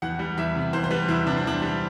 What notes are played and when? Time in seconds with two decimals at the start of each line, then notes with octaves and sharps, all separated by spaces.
0.02 E2 F#5
0.19 G3
0.37 E2 E5
0.55 C3
0.73 E2 C5
0.84 C5
0.91 G3 B4
1.08 E2 E4
1.26 C3 D4
1.37 C4
1.44 E2 D4
1.62 G3